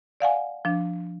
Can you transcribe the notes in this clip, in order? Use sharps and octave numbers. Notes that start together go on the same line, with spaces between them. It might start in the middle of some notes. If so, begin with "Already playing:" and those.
D5 F5 F#5 G#5
F3 D4